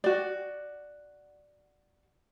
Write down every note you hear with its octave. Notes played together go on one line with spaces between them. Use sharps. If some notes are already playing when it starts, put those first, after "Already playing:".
F#4 D5